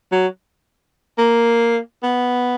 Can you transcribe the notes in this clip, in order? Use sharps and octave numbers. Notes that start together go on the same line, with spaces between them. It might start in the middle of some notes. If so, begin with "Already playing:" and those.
F#3
A#3
B3